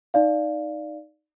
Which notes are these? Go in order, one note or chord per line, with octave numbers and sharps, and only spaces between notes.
D#4 D5 F5